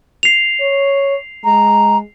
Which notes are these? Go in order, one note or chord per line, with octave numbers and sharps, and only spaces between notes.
C7 F7
C#5
G#3 A#5